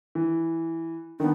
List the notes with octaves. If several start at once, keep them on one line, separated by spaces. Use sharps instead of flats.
E3
D#3 B3 D4